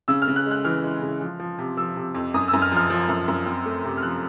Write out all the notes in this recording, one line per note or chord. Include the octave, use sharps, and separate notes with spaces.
C#3 E6
F6
C#3
F#6
G#3
F#6
E3 F6
G#3
C#3
F3
F3
C3
F3 E6
C3
F2
F#2 D#6
E6
F#2
F6
F3 F6
F3
F#2
F#2
C4
A3
C3
F6
F3 F#6